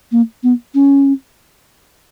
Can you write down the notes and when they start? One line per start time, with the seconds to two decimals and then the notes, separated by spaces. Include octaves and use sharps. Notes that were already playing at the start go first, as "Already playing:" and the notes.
0.12 A#3
0.43 B3
0.75 C#4